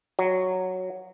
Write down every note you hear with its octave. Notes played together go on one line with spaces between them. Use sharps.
F#3